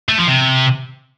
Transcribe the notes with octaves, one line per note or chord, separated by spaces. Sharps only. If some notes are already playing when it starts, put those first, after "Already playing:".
A3
F3
C3